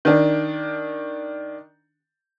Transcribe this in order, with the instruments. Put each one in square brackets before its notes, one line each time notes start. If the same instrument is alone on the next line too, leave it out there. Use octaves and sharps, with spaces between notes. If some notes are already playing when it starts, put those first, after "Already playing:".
[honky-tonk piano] D#3 D4